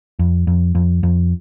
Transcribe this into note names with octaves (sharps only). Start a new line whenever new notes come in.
F2
F2
F2
F2